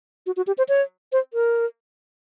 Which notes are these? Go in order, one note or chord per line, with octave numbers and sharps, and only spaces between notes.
F#4
F#4
G4
C5
C#5
C5
A#4